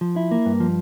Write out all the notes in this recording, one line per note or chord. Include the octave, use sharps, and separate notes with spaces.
F3
E4
A#3
G2
F3